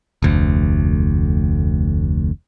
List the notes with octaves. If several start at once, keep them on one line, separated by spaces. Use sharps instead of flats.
F1 D2